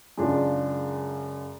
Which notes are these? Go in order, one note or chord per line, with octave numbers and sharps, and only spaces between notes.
F#2 C#3 G#3 D4 F4